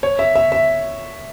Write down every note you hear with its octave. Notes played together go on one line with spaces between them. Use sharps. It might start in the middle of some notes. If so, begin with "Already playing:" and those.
C#5
E5
E5
E5